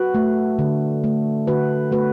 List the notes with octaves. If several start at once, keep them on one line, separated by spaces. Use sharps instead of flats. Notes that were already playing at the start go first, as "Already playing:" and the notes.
Already playing: F#4 B4
A3
D3
A3
D3 F#4 B4
A3 F#4 B4